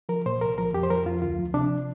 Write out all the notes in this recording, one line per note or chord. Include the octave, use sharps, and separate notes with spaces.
F3 A#4
A#2 C5
C2 A#4
F3 A#4
F2 G4
C5
F3 A#4
F2 F4
D2 F4
F3
C3 D4